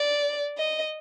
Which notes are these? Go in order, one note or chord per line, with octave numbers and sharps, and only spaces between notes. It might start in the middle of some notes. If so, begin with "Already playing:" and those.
Already playing: D5
D#5